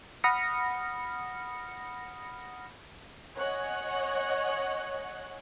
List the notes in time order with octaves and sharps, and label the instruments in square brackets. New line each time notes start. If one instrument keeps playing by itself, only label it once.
[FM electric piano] F#5 B5 D#6 F6 A#6 C#7
[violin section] C#5 D#5 F#5 G#5 F#6